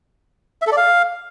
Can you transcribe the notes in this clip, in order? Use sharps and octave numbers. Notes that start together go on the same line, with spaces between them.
E5
A4
D5
F5